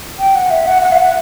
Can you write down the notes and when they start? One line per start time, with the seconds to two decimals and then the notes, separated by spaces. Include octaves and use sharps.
0.19 G5
0.35 F#5
0.50 E5
0.67 F#5
0.82 F#5
0.92 E5
0.98 F#5